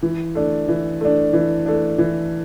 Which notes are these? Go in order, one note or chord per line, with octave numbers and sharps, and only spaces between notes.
E3
A3 D4
E3
A3 D4
E3
A3 D4
E3